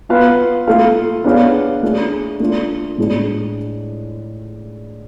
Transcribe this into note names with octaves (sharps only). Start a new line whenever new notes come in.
B3 F4 B4 F5
A3 F4 A4 F5
B3 D4 G#4 C#5 F5
A3 D4 G#4
A3 D4 F4
A2 G#3 D4